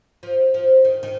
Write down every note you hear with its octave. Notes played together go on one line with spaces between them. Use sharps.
F3
F3
D#3
D#3